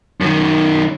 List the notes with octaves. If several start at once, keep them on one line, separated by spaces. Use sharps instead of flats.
F#2 D#3